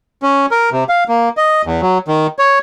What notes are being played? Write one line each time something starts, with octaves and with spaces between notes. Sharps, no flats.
C#4
A#4
C3
F5
A#3
D#5
E2
F#3
D#3
C#5